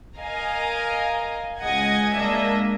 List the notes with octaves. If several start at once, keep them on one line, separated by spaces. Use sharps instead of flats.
A#4 D#5 F5 G#5 A#5
C#2 G#3 D#5 F#5 G#5 G#6
G#3 A#3 D4 D#5 E5